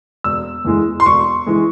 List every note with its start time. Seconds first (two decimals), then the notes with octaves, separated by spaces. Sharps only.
0.24 E1 E6
0.65 E2 E3 G#3
1.00 C6
1.06 E1 C#6
1.46 E3 G#3